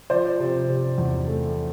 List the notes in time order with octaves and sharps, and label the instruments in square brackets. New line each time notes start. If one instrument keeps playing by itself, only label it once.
[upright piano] F3 C5 D5
C3
C3
E2
A3